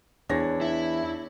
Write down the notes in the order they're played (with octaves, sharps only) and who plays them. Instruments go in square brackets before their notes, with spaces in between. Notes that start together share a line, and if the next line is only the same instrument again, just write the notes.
[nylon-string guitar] E2 [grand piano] D4 C#5 A#6
[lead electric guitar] E4